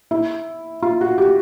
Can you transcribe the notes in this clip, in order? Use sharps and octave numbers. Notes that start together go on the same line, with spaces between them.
E4
F4
F#4
G4